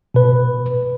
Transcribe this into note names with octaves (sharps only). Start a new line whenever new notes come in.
B2 B4